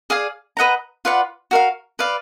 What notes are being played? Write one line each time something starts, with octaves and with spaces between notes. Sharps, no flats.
G#4 D5 F5 G#5
B4 D#5 F#5 A#5
F4 B4 D5 F#5
F#4 A#4 F5
B4 D5 F5